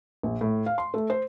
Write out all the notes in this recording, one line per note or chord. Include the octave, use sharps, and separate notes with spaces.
A#1
A2
F5
C6
A3
C5